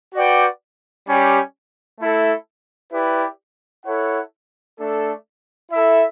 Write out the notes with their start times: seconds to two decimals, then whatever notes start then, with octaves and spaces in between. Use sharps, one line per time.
0.14 F#4 B4 D5 G5
1.07 G3 C#4 G4
1.99 A3 E4 A4
2.93 E4 G4 B4 D5
3.85 E4 A4 C#5 F#5
4.79 A3 D4 A4
5.71 E4 A4 E5